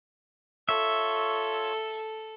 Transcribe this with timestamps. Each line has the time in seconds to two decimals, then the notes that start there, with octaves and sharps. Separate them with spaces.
0.69 F4 A4 C#5 E5 C#6